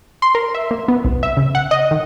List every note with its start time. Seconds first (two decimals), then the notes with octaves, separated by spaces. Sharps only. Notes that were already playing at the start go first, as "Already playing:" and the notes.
0.22 C6
0.35 A#4
0.54 E5
0.71 A#3
0.88 B3
1.04 C2
1.23 E5
1.37 C#3
1.55 F#5
1.71 D#5
1.91 D#3